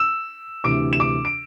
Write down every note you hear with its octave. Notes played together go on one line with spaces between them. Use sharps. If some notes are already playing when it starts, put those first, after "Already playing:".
Already playing: E6 E7
D2 C3 E3 D6 D7
E7
D6 D7
D7